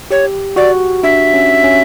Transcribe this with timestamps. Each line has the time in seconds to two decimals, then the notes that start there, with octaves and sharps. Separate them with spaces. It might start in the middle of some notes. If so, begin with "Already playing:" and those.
0.11 G4 C#5
0.56 F#4 D5
1.03 D4 E5
1.34 C#4
1.64 C#4